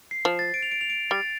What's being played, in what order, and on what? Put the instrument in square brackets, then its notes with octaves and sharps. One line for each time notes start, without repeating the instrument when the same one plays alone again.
[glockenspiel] C7
[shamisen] F3
[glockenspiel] A6
D7
F7
D7
F7
D7
[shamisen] G3 [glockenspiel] A6